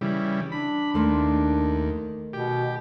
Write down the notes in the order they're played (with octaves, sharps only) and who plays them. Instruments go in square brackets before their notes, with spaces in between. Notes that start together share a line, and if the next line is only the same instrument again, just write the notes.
[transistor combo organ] C#3 E3 G3
[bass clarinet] D4 [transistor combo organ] B5
[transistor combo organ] D#2 [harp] D#3 A3 C6
[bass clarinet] B2 [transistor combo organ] G4